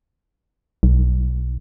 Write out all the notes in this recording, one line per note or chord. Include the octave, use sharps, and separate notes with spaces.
B1